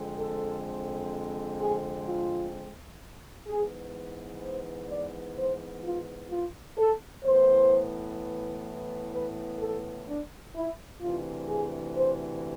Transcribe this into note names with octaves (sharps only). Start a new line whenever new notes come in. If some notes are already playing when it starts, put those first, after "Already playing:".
Already playing: F2 D3 G#3 C4
A4
G#4
F4
G#2 E3 B3 G#4
C5
D5
C5
F4
F4
A4
A2 E3 B3 C5
B4
A4
D4
E4
D2 C3 E3 F4
G#4
C5